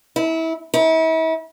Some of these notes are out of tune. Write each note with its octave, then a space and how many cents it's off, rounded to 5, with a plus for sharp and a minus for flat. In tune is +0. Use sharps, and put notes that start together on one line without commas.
E4 -25
E4 -40